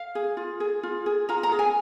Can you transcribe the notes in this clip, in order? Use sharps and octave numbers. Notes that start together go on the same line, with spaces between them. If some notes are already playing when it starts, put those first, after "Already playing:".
Already playing: F5
G#4
F4
G#4
F4
G#4
F4 A#5
A#5
G#4
G#5